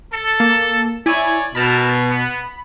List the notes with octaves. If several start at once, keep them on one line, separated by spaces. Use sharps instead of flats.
A4
A#3
E4 C#5 D5 G#5
B2 D#4 A#4 A5 B5
B3